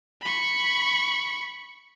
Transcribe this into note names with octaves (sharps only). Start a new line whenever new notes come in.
B5 C#6